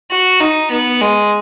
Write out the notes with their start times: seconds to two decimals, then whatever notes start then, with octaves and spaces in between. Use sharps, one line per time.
0.11 F#4
0.40 D#4
0.71 B3
1.01 G#3